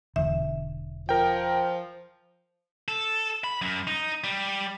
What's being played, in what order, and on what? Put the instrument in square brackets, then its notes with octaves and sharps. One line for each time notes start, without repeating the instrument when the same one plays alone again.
[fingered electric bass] E1 E2 D3 [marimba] E5
[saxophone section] F3 [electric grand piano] A#4 G5
[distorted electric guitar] A4
B5
F#2
D#4
G3